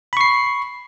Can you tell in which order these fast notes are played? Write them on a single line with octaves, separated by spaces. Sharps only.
B5 C#6 C7